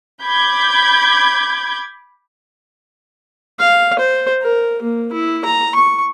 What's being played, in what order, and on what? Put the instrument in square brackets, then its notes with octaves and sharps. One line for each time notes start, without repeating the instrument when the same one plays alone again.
[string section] B5 D6 G6 G#6
[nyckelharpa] F5
C5
A#4
A#3
E4
A#5
C#6